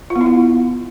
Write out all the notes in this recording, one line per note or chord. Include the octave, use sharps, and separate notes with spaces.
F4
B3
E4
B3